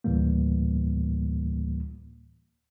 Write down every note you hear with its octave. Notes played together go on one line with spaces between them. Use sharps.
D2 A2 E3 G3 A#3